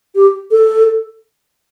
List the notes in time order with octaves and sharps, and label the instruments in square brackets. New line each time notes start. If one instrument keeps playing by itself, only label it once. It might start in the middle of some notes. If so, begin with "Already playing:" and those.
[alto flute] G4
A4